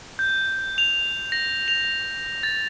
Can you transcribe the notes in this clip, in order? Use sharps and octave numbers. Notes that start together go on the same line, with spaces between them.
G6
F7
A#6
F7
A6